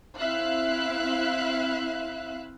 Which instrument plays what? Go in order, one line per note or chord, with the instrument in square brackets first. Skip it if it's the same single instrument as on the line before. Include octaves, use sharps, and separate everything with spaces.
[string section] C4 E4 E5 F5 F#6